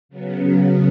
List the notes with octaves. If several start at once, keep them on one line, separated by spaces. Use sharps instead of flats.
C#3 F#3 B3